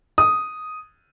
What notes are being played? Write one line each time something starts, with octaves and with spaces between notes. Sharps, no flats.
D#6